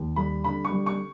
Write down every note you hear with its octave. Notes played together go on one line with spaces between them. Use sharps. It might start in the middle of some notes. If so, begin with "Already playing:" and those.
Already playing: D#2
G3 B5
D3 B5
C#6
G3
C#6